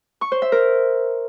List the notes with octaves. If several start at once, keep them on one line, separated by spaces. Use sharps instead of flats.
C#6
C5
E5
A#4